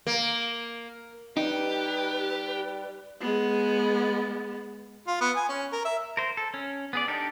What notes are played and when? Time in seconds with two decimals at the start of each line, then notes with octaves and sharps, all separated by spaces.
0.07 A#3
1.37 G3 D#4 G4 B4
3.21 G#3 B3
5.08 F4
5.21 B3
5.36 G#5
5.49 C#4
5.72 A#4
5.85 E5
6.17 A#4 C5
6.37 A4
6.54 C#4
6.93 B3 G#4 D5
7.08 D4 D#4 G4 A4 A#4